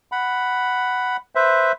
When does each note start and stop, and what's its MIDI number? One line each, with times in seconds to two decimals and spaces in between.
0.12 1.17 78
0.12 1.17 83
1.35 1.72 71
1.35 1.72 72
1.35 1.72 76